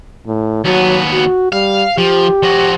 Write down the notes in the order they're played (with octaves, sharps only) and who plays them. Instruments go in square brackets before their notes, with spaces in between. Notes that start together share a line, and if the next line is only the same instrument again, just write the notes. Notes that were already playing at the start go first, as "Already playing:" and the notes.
[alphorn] A2
[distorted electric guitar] D#2 B3 [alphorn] F#3
[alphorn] F#4
[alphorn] G3 [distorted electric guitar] F5
[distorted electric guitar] F3 [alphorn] G4
[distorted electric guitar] F3 F#4